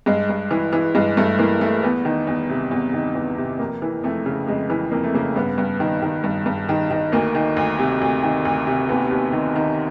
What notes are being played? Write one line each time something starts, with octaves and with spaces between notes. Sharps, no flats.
G2 G#3
G2
E3
E3
G2 G#3
G2 A3
E3 A#3
E3 A3
E2 B3
D#3
E2
C3
E2
D#3
E2
C3
F2 A#3
E3
F2 A3
C#3
F2 G#3
E3
F2 A#3
A3
C#3 A#3
G2 B3
G2
D#3
D#3
G2
G2
D#3
D#3
D2 A#3
D#3
D2
C3
D2
D#3
D2
C3
D#2 B3
D#2
D#3
D#3